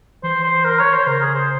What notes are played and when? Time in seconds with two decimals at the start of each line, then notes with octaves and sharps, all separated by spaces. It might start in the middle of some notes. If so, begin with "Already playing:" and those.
0.23 E3 C5
0.44 C5
0.65 A#4
0.79 C#5
0.93 C5
1.06 C#3 A#4
1.21 G#4
1.34 C5